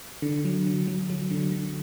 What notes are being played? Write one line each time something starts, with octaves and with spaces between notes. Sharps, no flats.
D3
F#3
D3
F#3
F#3
D3
D3